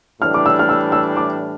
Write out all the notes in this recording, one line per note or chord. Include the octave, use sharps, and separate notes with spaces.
A2 E3 G3 D4 F6
D6
E6
F6
E6
E6
D6